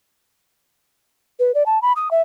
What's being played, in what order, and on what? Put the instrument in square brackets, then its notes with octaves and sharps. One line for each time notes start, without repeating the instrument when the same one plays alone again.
[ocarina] B4
D5
A5
B5
D#6
E5